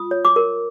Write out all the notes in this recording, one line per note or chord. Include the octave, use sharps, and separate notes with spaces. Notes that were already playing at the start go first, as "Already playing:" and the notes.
Already playing: F4 D#6
C#5
D6
A#4